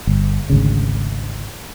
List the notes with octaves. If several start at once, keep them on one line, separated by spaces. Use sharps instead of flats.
G1
G#1 D2 C#3